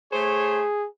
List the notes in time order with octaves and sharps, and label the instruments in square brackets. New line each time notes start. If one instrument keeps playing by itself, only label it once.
[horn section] A3 C5 C#5 [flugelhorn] G#4